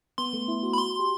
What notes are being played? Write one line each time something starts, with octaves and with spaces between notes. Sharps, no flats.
B3 C6
A3
E4
F#4
B5
C6
G4